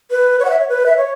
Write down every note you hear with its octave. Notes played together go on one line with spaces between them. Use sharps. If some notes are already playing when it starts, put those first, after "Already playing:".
B4
C#5
F#5
E5
C#5
B4
E5
C#5